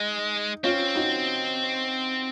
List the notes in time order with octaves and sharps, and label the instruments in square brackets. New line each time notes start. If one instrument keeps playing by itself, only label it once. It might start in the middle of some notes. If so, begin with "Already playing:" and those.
Already playing: [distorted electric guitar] G#3 [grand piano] D#4
[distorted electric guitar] C4 [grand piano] C#4 F4
[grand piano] D#4 F#4